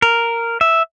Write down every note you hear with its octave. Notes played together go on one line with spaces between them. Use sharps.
A#4
E5